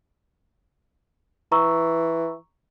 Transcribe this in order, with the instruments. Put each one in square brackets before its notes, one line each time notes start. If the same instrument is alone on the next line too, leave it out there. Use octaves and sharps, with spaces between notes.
[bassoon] E3 [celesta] A#5 C#6 E6